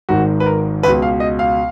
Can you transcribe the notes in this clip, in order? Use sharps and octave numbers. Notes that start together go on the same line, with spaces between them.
G#1 G#2 D#3 F#4
B4
A#4
C#2 B2 B4
F5
D#5
F5